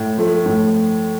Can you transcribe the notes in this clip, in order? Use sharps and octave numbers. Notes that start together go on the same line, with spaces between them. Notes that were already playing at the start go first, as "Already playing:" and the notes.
Already playing: A2
F3 A3
A2